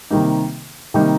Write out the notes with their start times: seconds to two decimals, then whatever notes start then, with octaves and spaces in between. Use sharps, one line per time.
0.10 C3 D#3 G3 A#3 D#4
0.94 C3 D#3 G3 A#3 D#4